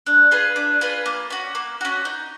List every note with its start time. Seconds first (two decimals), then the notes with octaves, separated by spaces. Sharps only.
0.06 D4
0.31 F4 G#4 B4
0.56 D4
0.81 F4 G#4 B4
1.06 A#3
1.30 C#4 F#4
1.55 A#3
1.81 C#4 F#4
2.05 D#4